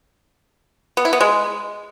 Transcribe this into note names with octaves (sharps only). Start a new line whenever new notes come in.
B3
E4
B3
G#3